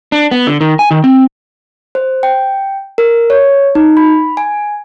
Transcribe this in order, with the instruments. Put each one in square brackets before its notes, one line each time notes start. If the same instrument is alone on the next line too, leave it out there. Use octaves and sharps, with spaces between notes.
[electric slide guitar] D4
B3
D3
D#3
G#5
D#3
C4
[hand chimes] C5
G5
A#4
C#5
D#4
B5
G#5